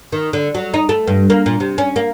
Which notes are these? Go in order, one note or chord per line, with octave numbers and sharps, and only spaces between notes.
D#3
D3
F#3
D#4
A3
G2
A#3
A#2
C3
C#4
A#3